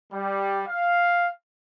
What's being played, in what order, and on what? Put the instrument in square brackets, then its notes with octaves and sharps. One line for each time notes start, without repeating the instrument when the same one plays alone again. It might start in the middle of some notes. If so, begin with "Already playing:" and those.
[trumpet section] G3
F5